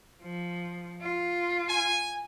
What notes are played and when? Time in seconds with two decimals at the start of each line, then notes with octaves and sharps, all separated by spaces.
0.22 F3
1.01 F4
1.70 G#5